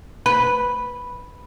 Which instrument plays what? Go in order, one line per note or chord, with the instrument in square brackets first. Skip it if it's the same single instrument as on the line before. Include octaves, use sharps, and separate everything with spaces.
[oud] B4